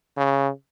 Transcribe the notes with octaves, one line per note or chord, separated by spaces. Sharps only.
C#3